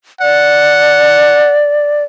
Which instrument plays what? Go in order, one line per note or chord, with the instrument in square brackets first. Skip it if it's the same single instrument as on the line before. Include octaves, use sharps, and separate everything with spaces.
[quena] D5 [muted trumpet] F#5